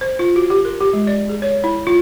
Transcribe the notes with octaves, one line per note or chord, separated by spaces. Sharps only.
C5
F4
F#4
G4
A#4
G4
G#3
D5
G#4
C#5
E4
F4